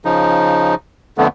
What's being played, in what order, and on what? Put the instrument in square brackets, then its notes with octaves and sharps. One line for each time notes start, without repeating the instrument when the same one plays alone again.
[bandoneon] C#3 F3 D#4
F2 D3 A3 B3